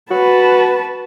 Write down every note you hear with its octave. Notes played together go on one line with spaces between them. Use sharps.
F#4 B4 A5